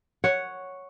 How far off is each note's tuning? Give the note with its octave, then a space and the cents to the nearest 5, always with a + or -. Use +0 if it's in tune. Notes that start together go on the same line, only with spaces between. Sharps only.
C#5 +0 F#5 +0